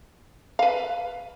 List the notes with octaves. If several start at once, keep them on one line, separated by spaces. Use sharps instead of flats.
B4 F5